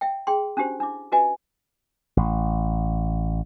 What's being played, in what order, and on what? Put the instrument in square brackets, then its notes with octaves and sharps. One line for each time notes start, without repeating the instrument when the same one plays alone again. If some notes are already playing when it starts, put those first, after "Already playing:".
[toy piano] E5 G5
G#4 G5 C6
C#4 D4 F#4 G4 C5
D4 E4 E5 D6
C#4 F4 F#4 B4 D#5 G#5
[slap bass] A1